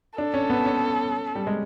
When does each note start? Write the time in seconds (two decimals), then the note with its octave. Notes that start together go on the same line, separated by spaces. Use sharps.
0.18 D4 A4
0.34 C#4
0.50 B3
0.65 C#4
1.35 G3
1.47 G#3